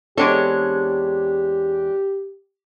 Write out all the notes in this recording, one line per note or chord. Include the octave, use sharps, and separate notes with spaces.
E2 G#3 C4 D4 G4 A4 C#5